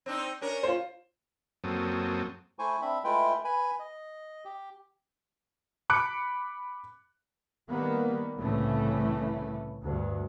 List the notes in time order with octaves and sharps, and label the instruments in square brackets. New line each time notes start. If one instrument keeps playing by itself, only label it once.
[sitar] C4 D4 D#4
C#4 D4 A#4
[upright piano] F4 C5
[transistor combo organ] F#2 F#3 A#3 C4 A4 D#6
[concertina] A3 E4 C5 G#5 C#6
C4 D4 E5 B5
G#3 A3 E4 F4 B4 G5
B4 G#5 B5
D#5
G4
[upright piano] B5 D6 F#6 C#7 D7
[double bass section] D#3 G3 A#3 B3
C2 A2 C#3 E3 A3
D2 G2